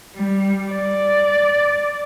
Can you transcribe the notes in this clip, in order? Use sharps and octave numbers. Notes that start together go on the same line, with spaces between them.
G3
D5